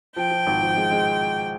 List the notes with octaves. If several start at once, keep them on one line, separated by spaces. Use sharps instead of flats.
F3 G5
F3
G#1
F3
G#3
G#3